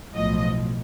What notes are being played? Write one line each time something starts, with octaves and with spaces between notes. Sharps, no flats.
B1 A2 F3 D#5